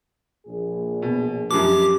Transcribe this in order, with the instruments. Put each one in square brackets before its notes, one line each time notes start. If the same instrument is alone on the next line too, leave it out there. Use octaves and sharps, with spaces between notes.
[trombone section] A#1 G#4
[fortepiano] B2
[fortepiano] F#2 F3 [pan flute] G4 [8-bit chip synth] D6